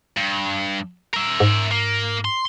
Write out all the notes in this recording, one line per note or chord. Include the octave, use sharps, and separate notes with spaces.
G2
A#4 E5
G#2
A#3
C6